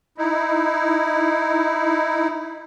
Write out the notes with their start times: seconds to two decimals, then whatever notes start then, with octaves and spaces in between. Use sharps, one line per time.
0.18 D#4 E4